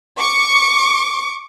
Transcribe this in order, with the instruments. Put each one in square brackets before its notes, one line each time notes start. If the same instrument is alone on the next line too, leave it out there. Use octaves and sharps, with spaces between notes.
[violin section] C#6 D6